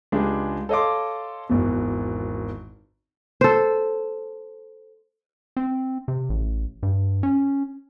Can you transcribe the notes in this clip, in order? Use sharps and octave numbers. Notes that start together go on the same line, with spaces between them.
C#2 G#3 D4 G4
A4 C#5 D#5 F5 C6 D6
G#1 E2 B2
A4 C5
C4
C3
A1
G2
C#4